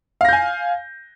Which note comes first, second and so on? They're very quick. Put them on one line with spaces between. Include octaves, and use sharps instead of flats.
F5 A#6 G6 G#5